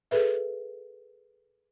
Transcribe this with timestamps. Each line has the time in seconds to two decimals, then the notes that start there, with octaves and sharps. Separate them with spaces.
0.11 G#4 A4 B4 E5